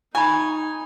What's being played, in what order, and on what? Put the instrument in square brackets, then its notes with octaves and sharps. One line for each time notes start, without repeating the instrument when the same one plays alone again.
[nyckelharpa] D#4 [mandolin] G#5 [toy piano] B5 C#6